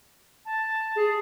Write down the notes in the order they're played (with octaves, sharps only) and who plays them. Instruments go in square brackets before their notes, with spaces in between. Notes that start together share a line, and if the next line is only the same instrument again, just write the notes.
[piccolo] A5
[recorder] G#4